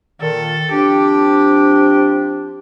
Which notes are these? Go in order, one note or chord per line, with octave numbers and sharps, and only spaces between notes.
A#2 D#3 A4
F3 C4 D4 G4